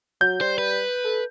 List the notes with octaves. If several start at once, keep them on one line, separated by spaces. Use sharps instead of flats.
F#3 G6
G3 C5
B4
A4